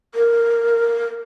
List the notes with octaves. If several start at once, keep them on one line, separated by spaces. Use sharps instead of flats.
A#4